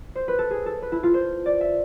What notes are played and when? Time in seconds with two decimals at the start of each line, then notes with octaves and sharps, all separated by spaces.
0.15 C5
0.28 B4
0.39 A4
0.51 G#4
0.66 A4
0.82 B4
0.92 E4
1.03 F4
1.14 C5
1.46 D5
1.61 E5